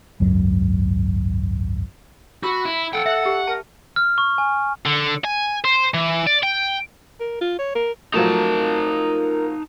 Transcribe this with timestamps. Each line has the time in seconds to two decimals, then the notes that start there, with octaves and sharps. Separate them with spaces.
0.20 G#1 C#2 F#2 F#3
2.43 F#4 B5 E6
2.65 E4
2.93 A4 F#5 G5
3.06 E5 F#5
3.24 G4 A5
3.47 A#4 A5
3.96 F6
4.18 C#6
4.38 G#5
4.86 D3
5.24 G#5
5.64 C5
5.94 E3
6.27 D5
6.43 G5
7.20 A#4
7.41 F4
7.59 C#5
7.75 A#4
8.14 F3 F#3 A3 D#4 A#4 A5